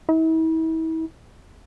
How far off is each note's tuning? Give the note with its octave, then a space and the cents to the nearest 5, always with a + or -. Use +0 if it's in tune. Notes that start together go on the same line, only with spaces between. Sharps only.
E4 -40